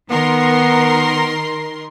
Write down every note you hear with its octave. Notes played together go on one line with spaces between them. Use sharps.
D#3 B3 A#4 C6